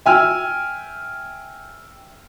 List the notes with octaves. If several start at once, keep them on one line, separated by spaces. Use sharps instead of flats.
E5 G5 G#5 E6 F6